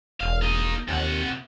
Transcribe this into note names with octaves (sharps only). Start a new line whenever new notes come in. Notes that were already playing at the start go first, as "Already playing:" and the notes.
E1 F5
A#3 D#4
D#2 C3 F#5